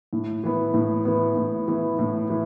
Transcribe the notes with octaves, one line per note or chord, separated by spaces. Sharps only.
A2
E3 B3
A2
E3 B3
A2
E3 B3
A2
E3